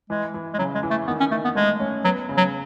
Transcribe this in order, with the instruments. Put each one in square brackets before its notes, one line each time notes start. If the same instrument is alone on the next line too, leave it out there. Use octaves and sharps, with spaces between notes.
[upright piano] E3 [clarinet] G#3
[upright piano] E3
[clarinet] G#3
[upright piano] C#3 [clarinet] F#3
[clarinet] G#3
[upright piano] E3
[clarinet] A3
[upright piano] D#3 [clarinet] B3
[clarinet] C#4
[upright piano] D#3 [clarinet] A3
[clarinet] B3
[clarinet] G#3 [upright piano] A3
[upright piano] C#4
[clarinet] F#3 [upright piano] B3
[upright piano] C#3
[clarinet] F#3